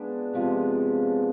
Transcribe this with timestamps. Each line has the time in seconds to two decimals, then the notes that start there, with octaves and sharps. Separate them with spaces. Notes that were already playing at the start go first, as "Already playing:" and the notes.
Already playing: G#3 B3 D4 F4 G#4
0.33 C3 F3 G#3 B3